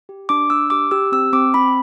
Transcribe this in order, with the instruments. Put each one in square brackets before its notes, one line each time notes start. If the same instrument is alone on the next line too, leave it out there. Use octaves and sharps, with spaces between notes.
[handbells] G4
D4 D6
D4 E6
G4 D6
G4 E6
C4 E6
C4 D6
C4 B5